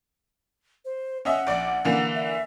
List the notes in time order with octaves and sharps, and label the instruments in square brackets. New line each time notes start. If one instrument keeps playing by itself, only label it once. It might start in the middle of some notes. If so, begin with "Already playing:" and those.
[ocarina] C5
[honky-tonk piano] C#4 D#5 E5 [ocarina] F#5
[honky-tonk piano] A#1 D5
D3 E3 A#3
[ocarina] E5